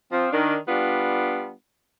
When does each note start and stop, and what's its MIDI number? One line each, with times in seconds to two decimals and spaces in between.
0.12 0.28 53
0.12 0.28 60
0.33 0.56 51
0.33 0.56 62
0.68 1.52 55
0.68 1.52 59
0.68 1.52 62
0.68 1.52 65